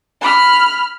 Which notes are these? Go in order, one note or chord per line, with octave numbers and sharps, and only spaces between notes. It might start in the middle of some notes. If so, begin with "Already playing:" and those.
B5 F6